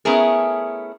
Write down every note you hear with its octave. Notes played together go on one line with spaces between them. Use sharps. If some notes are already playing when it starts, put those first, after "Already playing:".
A3 B3 C#4 E4 G#4 A#4